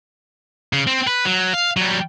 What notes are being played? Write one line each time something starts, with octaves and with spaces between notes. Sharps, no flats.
C#3
C4
B4
F#3
F5
F#3 G3